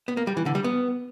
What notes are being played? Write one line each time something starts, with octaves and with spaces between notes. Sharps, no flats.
B3
A#3
G3
E3
D3
G3
B3